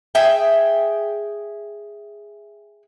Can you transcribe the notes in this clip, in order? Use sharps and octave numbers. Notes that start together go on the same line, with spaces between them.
G#4 E5 G5